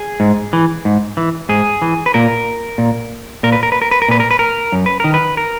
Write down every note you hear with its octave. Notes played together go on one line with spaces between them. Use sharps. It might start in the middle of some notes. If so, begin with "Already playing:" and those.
Already playing: G#4
G#2
E3
G#2
E3
G#2 G#4
E3
B4
A#2 A#4
A#2
A#2 A#4
B4
A#4
B4
A#4
B4
A#4
A#2 B4
A#4
B4
A#4
F#2
B4
D#3 A#4
B4
A#4